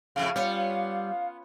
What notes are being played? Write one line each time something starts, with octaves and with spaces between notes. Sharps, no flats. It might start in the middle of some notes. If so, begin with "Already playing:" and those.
F2 A2 C#3 F5
G3 B3 C#4 F4 C#5